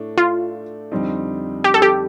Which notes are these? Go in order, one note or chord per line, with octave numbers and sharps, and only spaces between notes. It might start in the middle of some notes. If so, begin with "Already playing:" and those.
Already playing: A2 A3 D4
F4
F2 D3 G3 C4 D#4
G4
A4
G4